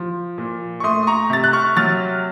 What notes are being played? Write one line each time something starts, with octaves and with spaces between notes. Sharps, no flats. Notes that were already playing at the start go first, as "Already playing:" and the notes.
Already playing: F3
A#2
C#6
A3 C6 D#6
D#6
A#5 C#6
C3 A6
F#6
C#6 F6
F#3 F6 A6